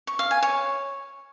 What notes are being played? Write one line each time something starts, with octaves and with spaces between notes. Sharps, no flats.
C#6
F5
G#5
C#5